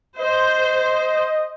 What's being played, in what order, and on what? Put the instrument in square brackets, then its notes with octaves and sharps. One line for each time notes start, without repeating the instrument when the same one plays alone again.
[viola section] C5 [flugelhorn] D#5